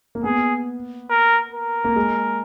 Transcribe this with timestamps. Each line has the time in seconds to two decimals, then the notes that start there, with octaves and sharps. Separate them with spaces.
0.15 A#3
0.24 B3 G#4
1.10 A#4
1.53 A#4
1.84 A#3
1.96 G#3